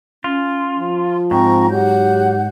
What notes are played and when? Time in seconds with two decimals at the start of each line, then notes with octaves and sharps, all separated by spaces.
0.24 C#4 F4
0.79 F3
1.31 G#2 C4 G5 A#5 C#6
1.71 F#3 G4 F#5 G6